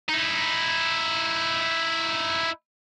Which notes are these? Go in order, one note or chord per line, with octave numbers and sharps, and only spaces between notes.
D#4 E4